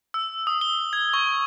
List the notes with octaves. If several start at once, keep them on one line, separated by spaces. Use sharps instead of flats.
E6
D#6
G7
G#6
C#6